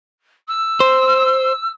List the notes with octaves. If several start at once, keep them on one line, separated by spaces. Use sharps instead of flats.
E6
C5